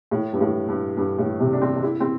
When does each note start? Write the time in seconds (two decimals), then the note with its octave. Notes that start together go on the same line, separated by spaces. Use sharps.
0.11 A2
0.33 G2
0.41 A2
0.68 G2
0.97 G2
1.19 A2
1.40 C3
1.53 D4
1.61 C4
1.76 D4
1.83 E4
2.00 C4